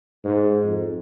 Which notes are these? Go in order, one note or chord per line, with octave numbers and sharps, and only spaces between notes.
G#2
F2